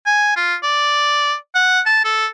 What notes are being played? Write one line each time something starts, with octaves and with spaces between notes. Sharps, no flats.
G#5
F4
D5
F#5
A5
A4